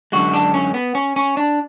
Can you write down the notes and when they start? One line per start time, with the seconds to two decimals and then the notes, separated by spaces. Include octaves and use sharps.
0.12 F#2 D3 G#3 F#4
0.34 D4
0.54 C#4
0.74 B3
0.95 C#4
1.16 C#4
1.37 D4